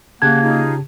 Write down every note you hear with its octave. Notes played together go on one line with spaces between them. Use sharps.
C#3 A#3 G4 F#5 A5 F#6 G#6
D#4 F4 G#4